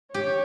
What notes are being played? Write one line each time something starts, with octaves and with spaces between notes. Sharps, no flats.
G4 C#5